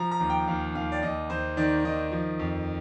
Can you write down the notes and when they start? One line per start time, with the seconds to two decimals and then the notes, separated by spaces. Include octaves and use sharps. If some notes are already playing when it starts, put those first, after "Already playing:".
Already playing: F3 A#5
0.11 A#5
0.20 D#2
0.30 G5
0.47 D#2 F5
0.75 D#2 F5
0.92 D5
1.02 D#2 D#5
1.30 D#2 C5
1.57 D#3 D5
1.85 D#3 D#5
2.12 F3
2.39 F2